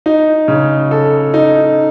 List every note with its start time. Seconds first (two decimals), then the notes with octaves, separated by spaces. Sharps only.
0.06 D#4
0.48 C#3
0.91 A4
1.34 D#4